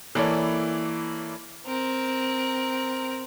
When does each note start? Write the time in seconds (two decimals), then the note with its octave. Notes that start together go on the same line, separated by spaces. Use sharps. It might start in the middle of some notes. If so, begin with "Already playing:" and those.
0.15 E3 A#3 E4 A4 C#5 D5
1.66 C4 A#4